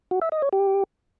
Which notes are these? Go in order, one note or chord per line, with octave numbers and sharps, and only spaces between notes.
F#4
E5
D#5
C#5
G4